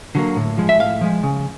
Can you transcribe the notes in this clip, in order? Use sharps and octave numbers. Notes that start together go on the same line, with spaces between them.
D3 F#3 A#3
A2
F3 G#3
E5
A2 F5
F3 G#3
C#3